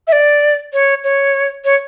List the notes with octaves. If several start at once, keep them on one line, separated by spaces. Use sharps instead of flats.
E5
D5
C#5
C#5
C#5